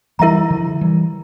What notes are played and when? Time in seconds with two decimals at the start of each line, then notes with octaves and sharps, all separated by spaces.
0.19 E3 G3 E4 A#4 E5 A#5
0.50 D3 F3
0.81 E3 G3